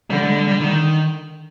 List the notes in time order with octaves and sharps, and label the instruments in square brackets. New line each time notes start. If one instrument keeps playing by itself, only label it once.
[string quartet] D3 [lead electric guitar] G3
[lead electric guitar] G#3
G3
G3
D#3